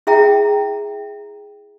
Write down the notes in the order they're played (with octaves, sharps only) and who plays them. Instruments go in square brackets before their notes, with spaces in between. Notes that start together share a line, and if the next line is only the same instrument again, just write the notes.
[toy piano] E4 G#4 E5 G5 A#5